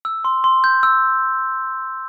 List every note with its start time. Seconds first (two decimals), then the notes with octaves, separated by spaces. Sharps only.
0.05 E6
0.25 C6
0.44 C6
0.64 G6
0.83 E6